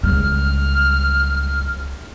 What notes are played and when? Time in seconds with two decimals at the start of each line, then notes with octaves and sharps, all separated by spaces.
0.03 C#2 G3 F6